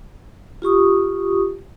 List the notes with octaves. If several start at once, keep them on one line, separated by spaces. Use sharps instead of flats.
F4 G4 C#6 D#6